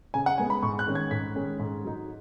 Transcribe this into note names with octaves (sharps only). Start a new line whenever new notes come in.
C#3 G#5
F#5
G#3 B3 G#5
B5
G#2 C#6
F#6
D#3 G#3 C#4
G#6
G#2 B6
D#3 G#3 C#4
G#2
F#3 D#4